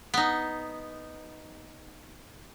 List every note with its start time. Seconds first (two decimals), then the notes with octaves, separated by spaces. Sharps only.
0.14 B3 D#4